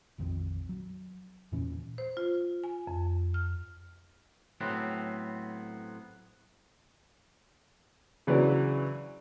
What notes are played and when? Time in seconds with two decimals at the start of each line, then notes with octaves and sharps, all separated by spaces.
0.18 A#1 F2 D#3 C4
0.69 F#3
1.52 E2 A#2 E3 C#4
1.98 C5
2.17 F4
2.64 G#5
2.87 F2
3.34 F6
4.61 A2 F#3 B3 C4
8.27 C#3 E3 F#3 D4